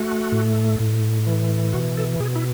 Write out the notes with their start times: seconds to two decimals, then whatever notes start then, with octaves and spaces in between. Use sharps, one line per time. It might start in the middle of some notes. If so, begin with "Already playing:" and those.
Already playing: A3 F#4
0.32 A2
0.80 A2
1.27 E3
1.73 B2 F#4
1.97 A4
2.20 B2 G#4
2.36 E4